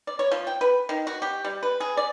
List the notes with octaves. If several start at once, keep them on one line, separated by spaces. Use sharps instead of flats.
D5
C#5
F3
G5
B4
D#3
F#4
G4
G3
B4
G#4
D5